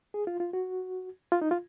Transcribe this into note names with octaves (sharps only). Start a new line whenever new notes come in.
G#4
F4
F4
F#4
F4
D#4
F4